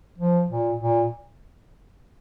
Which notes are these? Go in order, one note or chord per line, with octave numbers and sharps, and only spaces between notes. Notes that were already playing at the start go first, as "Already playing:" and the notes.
F3
A#2
A#2